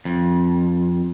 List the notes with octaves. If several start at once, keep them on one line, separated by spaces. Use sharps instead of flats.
F2